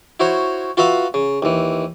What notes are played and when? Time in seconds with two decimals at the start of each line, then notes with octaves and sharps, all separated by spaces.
0.20 E4 F#4 C5 C#5
0.77 F4 F#4 B4 E5 F5
1.14 C#3
1.42 D#2 E3